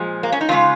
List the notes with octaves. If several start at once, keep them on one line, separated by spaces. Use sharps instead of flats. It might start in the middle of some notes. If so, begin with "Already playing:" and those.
Already playing: A#2 F3 G#3
A#3
C#4
D#4
F2 C#3 G#3 F4